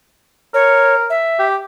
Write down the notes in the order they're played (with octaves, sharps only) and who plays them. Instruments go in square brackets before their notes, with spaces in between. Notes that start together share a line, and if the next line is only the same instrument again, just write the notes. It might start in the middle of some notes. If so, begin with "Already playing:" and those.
[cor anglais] A#4 [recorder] C#5
[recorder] E5
[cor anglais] G4